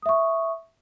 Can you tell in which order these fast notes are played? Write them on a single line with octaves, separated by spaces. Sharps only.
D#6 E5 C#6